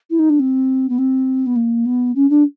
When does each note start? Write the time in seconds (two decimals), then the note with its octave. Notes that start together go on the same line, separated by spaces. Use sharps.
0.10 E4
0.19 D#4
0.30 D4
0.39 C4
0.89 B3
0.98 C4
1.46 B3
1.56 A#3
1.85 B3
2.15 C#4
2.30 D4